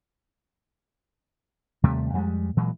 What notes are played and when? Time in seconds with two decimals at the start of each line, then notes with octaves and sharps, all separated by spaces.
1.83 D#2 C3 G3 A3
2.13 F2 G3 G#3
2.57 A#2 E3 F#3 G#3